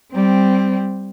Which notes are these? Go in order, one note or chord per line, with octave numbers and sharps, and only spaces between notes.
G3 C4